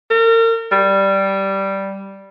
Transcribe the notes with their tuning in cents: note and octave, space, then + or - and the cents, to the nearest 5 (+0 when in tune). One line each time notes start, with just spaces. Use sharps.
A#4 -35
G3 -5